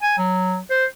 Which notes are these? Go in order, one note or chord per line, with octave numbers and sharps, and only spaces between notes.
G#5
F#3
C5